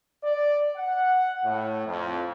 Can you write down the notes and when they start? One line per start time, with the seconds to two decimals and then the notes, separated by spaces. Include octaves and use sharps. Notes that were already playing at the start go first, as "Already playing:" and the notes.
0.23 D5
0.76 F#5
1.45 A2
1.86 F2